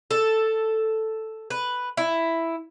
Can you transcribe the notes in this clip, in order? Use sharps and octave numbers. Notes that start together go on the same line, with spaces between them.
A4
B4
E4